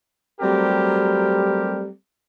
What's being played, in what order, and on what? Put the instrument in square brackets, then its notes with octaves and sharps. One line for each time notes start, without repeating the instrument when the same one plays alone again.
[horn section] F#3 G3 A3 C4 G4 A#4